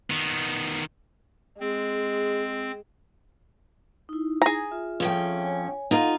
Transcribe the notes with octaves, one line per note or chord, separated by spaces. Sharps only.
D#3 B3
G#3 C4 G#4
D#4 E4
G#4 A#5
F4 E5
F2 C#4 G5
C#5 G#5
D#4 F4 A4 F5 F#5